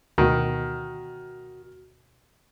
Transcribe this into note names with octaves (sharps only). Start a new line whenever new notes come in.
D2 B2 D#3 F#4